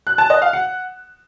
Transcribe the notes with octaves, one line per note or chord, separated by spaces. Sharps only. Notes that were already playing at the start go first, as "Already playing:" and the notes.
F#6
A5
D#5
F5
F#5